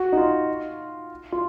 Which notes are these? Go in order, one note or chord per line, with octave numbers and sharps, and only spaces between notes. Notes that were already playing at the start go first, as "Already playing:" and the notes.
Already playing: F#4
D#4
F4
F4